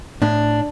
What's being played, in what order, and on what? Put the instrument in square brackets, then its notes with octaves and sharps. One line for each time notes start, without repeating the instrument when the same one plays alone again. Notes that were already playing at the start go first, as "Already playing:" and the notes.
[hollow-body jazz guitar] A2 [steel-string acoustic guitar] D4